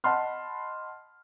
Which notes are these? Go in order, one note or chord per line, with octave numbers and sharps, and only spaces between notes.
D#5 F#5 A5 B5 C6 F6